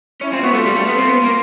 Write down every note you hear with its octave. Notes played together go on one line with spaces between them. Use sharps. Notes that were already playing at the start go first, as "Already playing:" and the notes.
C#4 E4
C4 F4
B3 F#4
A3 F4
G3
A3
B3
C4
B3
A#3